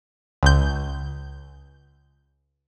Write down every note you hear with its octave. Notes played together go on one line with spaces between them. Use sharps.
C#2 G6